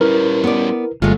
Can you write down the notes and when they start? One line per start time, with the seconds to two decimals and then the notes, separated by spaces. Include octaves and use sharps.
0.01 G3 C#4 E4 A#4 B4
0.44 B3 D5
1.02 G1 F#3 G#3 A3 F4